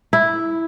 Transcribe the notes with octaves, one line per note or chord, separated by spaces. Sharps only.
E4